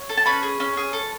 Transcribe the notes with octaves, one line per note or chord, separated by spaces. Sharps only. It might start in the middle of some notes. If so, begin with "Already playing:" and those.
Already playing: C#5
A4
A5
C#4 B4 B5
G#4
C#4
G#4
A4